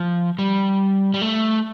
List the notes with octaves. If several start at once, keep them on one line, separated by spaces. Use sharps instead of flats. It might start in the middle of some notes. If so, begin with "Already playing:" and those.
Already playing: F3
G3
G3
A3